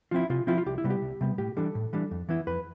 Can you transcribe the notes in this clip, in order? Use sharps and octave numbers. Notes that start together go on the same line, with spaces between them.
F3 C4 E4 F4
C3 F4
F3 C4 E4 F4
F4
C2 G4
E4
C3 G3 B3
G4
C2
C3 G3 B3
A2 G4
E3 G3 D4 A4
A2
E3 G3 D4
F2
E3 B3 E4
F2 B4